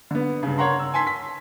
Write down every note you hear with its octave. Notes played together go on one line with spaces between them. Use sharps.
D3 B3
G2 C#3
A#4 C#5 F#5 A#5 C6
E6
G#5 A5 C6 B6
B6